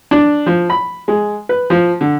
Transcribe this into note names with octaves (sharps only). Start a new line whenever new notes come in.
D4
F3
B5
G#3
B4
F3
D3